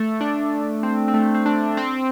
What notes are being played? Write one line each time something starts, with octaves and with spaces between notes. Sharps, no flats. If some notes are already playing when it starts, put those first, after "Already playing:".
Already playing: A3
D4
C4
C4
A3
C4
D4
C4